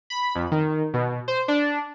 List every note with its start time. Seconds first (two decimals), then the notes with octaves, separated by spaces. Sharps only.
0.10 B5
0.35 F2
0.51 D#3
0.94 B2
1.28 C5
1.48 D4